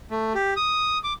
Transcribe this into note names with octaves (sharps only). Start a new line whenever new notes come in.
A3
G4
D#6
D6